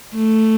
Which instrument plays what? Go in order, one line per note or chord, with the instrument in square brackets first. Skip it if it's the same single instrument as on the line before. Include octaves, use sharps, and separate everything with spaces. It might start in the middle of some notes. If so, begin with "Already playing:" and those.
[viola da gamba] A3